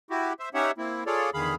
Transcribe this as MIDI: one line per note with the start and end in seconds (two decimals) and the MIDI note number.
0.10 0.33 64
0.10 0.33 66
0.10 0.33 67
0.39 0.49 72
0.39 0.49 76
0.54 0.71 61
0.54 0.71 63
0.54 0.71 67
0.54 0.71 73
0.54 0.71 76
0.54 0.71 78
0.78 1.04 58
0.78 1.04 60
0.78 1.04 64
1.06 1.30 65
1.06 1.30 68
1.06 1.30 69
1.06 1.30 73
1.06 1.30 74
1.34 1.55 40
1.34 1.55 50
1.34 1.55 51
1.34 1.55 68
1.34 1.55 77
1.34 1.55 83